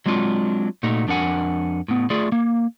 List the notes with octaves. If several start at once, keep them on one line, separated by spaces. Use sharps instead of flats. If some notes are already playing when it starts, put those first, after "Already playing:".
F#3 G#3 C4 D4 F4
A#2 A3 D#4 F#4
F2 D4 A#4 F#5 G#5
A2 B3
A3 F4 G#4 D5
A#3